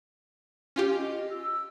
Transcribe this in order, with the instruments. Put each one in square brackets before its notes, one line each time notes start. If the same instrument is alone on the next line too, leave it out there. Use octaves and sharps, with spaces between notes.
[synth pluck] C#4 F4 G4
[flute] D#5
E6